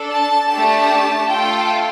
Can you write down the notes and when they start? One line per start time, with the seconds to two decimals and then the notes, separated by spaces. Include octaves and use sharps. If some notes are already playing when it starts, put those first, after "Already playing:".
Already playing: D4 A4
0.11 A5
0.50 A3 D4 G4 A5
1.28 A3 F4 A4 G5